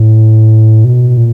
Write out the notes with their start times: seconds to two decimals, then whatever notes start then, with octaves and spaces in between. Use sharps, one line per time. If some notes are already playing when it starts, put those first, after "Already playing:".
Already playing: A2
0.85 B2
1.17 A#2